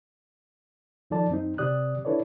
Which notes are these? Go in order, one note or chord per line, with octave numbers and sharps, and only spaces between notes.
D#2 F3 D#4 A4 D5 A5
F#2 C4 D#4
C3 C4 G4 D5 D#6 F#6
D4 E4 A4 B4 C#5 D5